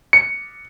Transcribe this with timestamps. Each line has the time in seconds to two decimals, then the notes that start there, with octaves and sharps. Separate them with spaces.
0.13 C#7